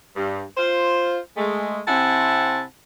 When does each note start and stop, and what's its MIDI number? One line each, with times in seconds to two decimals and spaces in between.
0.16 0.43 43
0.57 1.18 65
0.57 1.18 72
1.37 1.80 56
1.37 1.80 57
1.88 2.62 48
1.88 2.62 60
1.88 2.62 64
1.88 2.62 78
1.88 2.62 80
1.88 2.62 81